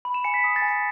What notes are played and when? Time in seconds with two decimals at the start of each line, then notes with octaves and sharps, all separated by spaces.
0.05 B5
0.14 E7
0.24 G#5 C#7
0.34 B6
0.44 D#6
0.56 A6
0.62 G#5
0.68 C#7